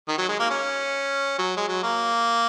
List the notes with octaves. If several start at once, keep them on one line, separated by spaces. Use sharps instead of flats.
D#3
F#3
G#3
A#3
C#4
F#3
G#3
F#3
A#3